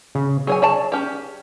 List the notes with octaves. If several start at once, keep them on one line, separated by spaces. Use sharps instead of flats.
C#3
F#3 G#4 C#5 G#5
C#5 D5 A5
C#4 G4